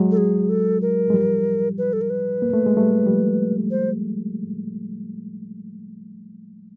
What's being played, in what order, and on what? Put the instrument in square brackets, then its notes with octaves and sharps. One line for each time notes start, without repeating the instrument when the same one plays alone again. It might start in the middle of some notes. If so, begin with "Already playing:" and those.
Already playing: [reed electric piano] F#3 G#3
[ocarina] A4
G#4
A4
A#4
[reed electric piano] G#3
F3 G3
[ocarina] B4
A4
A#4
B4
[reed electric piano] A#3
A3
G#3
G3 A3
F3 G3
[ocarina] C5